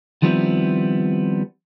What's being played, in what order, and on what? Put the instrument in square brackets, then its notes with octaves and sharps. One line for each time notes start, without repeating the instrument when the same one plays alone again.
[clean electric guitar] D#3 F3 G3 B3 C4 E4